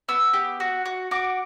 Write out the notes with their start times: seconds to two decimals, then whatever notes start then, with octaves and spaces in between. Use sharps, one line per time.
0.09 B3 E6
0.33 G4
0.60 F#4
0.86 F#4
1.11 F#4 D6